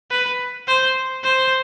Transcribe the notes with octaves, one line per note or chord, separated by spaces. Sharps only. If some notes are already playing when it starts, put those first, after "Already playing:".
B4
C5
C5